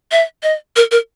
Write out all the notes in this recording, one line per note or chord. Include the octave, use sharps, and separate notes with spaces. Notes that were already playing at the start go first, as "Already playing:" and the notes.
E5
D#5
A#4
A#4